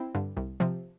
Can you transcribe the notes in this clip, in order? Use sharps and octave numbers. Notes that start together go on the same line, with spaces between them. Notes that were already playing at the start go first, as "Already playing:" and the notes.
Already playing: C4 E4
G2 D3
C2
C3 F3